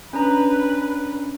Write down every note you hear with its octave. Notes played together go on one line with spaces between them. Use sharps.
C#4 D4 B4 A#5